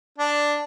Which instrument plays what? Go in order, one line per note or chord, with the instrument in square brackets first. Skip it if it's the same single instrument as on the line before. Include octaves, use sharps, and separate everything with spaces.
[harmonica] D4